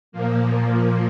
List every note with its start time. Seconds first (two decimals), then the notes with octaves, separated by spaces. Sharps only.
0.12 A#2 F3 A#3